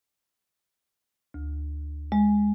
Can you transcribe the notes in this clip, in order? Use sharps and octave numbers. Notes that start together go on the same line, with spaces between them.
D2
G#3